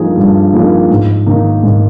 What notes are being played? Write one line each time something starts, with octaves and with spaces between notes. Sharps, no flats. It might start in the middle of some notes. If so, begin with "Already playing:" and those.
Already playing: G2 F3 A#3 D#4 G#4
G2
F3 A#3 D#4 G#4
G#2
D#3 A#3 D#4
G#2